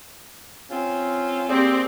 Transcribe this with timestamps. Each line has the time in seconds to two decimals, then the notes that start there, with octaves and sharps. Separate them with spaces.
0.69 C4 C#4 F4
1.48 A#3 C4 G4 G#4 D5